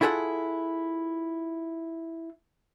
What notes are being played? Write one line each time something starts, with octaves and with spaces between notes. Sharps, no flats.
E4 F4 G#4 A4 D#5 F#5